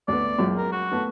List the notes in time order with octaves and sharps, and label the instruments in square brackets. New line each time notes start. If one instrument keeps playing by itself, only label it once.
[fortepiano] D2 B3 [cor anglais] D5
[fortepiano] C#2 F#2 A#2
[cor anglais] A#4
F#4
[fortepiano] A3 B3